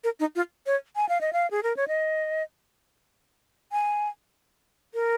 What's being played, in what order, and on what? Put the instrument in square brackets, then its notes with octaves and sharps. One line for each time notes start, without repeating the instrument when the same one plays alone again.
[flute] A#4
D#4
F4
C#5
G#5
F5
D#5
F5
G#4
A#4
C#5
D#5
G#5
A#4